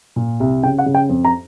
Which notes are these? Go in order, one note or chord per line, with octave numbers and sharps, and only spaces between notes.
A#2
C2
C#3 G5
F#5
C#3
G5
F2
A#5